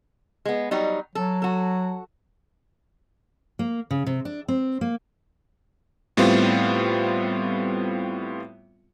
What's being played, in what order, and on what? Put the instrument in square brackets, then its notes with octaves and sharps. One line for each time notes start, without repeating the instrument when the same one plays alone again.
[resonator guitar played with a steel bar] G#3 B3
F#3 G3 D#4
[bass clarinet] F#3 [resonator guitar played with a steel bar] A4
[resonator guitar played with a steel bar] F#4 A4
[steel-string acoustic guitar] A#3
C#3
C3
D4
C4
A#3
[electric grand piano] A2 G3 B3 C4 F4